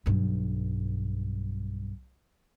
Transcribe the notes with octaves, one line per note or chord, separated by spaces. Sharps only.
B1 G2